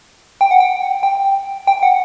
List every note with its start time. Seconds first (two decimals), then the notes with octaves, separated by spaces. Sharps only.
0.41 G5
0.51 F#5
0.60 G5
1.03 G5
1.67 G5
1.83 F#5